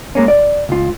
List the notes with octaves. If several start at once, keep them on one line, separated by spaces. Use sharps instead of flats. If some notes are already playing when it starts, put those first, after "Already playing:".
G#3 A#3 C#4
D5
C#2 F4